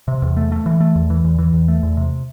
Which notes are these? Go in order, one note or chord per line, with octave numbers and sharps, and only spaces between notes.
C3
E2
A3
A3
E3
A3
E2
E3
E2
E3
E2
A3
E2
C3